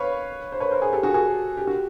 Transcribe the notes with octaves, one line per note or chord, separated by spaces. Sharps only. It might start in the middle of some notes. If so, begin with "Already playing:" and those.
Already playing: B4 C#5 F5 C#6
C5
B4 C#5
A#4 C5
G#4 A#4
G4 A4
F#4 G#4
F#4 G#4
G4
F#4